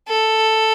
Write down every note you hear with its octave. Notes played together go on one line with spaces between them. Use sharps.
A4